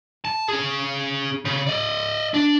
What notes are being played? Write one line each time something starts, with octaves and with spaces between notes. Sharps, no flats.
A5
C#4 G#4
C#3
D5 D#5
D4